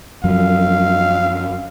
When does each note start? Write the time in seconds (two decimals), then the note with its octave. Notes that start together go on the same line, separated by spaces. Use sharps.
0.24 F#2 F3 F#3 F5